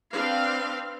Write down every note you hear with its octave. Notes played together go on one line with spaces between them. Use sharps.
C4 D4 B4 F5